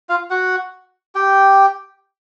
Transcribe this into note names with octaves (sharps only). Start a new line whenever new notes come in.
F4 F5
F#4 F#5
G4 G5